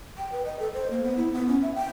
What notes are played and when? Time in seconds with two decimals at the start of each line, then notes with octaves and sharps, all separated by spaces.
0.18 G5
0.32 B4
0.45 D#5
0.59 A4
0.74 C5
0.91 A#3
1.03 B3
1.17 E4
1.33 B3
1.48 C#4
1.62 E5
1.75 G5